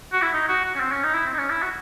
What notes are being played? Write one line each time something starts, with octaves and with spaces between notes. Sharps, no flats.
F#4
E4
D#4
F#4
F#4
C#4
C4
C#4
D#4
E4
C4
D#4
C#4
E4
F#4